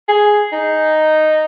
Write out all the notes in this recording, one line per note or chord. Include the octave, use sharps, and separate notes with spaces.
G#4
D#4